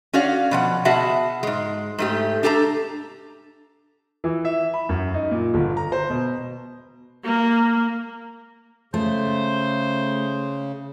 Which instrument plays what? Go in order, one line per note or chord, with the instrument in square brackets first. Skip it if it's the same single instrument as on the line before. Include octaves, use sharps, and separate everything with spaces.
[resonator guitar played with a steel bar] C#4 F#4 C#5 D5 F5
B2 F3 F#5
B2 F#4 G#4 E5 F#5 A5
G#2 G#3
G#2 A3 G4
D4 G4 A4 G5 A#5
[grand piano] E3
E5
B5
F#2
D#4
A#2
G1
A#5
C5
B2
[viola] A#3
[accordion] C#3 [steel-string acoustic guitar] A3 [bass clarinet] C5